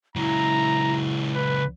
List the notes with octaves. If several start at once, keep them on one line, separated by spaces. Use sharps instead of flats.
C#2 F#3 E4 A#5
B4